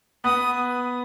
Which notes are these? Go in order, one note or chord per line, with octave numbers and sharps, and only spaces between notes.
B3 B4 D#6